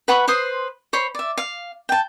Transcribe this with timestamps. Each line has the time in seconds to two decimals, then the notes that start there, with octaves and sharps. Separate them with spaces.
0.08 B4 F#5 B5 C#6
0.28 B4 C5 C6 D#6
0.93 C5 C#5 B5
1.15 D5 E5
1.38 F5
1.89 G5 A5